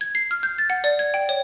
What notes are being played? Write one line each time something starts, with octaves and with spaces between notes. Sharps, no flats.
G#6
C7
F6
G6
A6
F#5
D5
G#6
G5
C#5